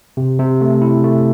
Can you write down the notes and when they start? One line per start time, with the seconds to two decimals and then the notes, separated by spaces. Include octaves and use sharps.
0.17 C3
0.40 C3
0.61 A3
0.82 E4
1.04 A3